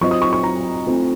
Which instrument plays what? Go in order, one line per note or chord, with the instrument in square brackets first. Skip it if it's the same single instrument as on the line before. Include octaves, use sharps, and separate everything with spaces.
[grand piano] F#3 C4 F4 C5 D#5 [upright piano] C#6
[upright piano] D#6
C#6
C#6
A#5
[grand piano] A3 C4 F4